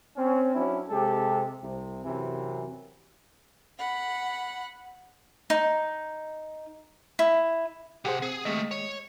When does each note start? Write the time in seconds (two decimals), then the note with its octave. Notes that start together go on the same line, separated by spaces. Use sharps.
0.17 C4 C#4
0.55 F#3 C#4 D4 E4
0.89 C3 G#3 G4 A4
1.62 C2 C3
2.05 F#2 C3 E3
3.79 F#5 B5
5.50 D#4
7.19 E4
8.05 C3 G4 G#4 C5 F#5
8.22 C4 G#4
8.45 D#2 G#3 A3 D#5
8.71 C#5